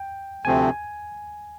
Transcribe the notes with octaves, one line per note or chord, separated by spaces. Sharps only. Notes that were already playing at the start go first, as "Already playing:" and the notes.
Already playing: G5
D2 C3 F3 A3 C4 G#5